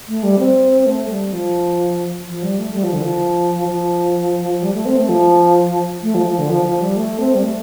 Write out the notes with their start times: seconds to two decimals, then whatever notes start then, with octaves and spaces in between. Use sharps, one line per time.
0.08 A3
0.23 G3
0.39 C4
0.86 A3
1.10 G3
1.33 F3
2.27 F3
2.43 G3
2.59 A3
2.74 G3
2.83 F3
2.93 D3
3.02 F3
3.68 F3
4.62 G3
4.74 A3
4.86 C4
4.97 A3
5.09 F3
6.03 A3
6.15 F3
6.26 F3
6.38 D3
6.50 F3
6.65 F3
6.81 G3
6.97 A3
7.20 C4
7.34 G3
7.44 A3